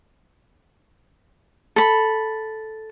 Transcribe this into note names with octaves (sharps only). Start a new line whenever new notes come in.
A4 B5